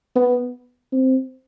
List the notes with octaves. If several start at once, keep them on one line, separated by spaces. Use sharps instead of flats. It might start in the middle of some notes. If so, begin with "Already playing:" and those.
B3
C4